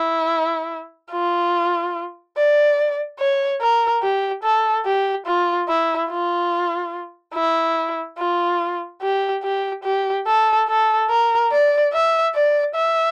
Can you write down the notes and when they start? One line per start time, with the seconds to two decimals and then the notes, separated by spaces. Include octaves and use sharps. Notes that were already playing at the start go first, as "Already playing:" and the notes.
Already playing: E4
1.12 F4
2.36 D5
3.19 C#5
3.61 A#4
4.02 G4
4.43 A4
4.85 G4
5.27 F4
5.68 E4
6.10 F4
7.34 E4
8.18 F4
9.02 G4
9.43 G4
9.84 G4
10.26 A4
10.68 A4
11.09 A#4
11.51 D5
11.92 E5
12.34 D5
12.75 E5